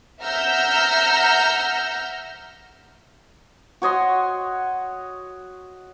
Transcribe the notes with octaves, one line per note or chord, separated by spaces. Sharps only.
E5 F#5 A#5 E6 F6 G6
F#4 C#5 D#5 C6